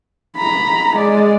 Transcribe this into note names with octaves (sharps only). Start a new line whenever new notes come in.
A#5 B5
G#3 D5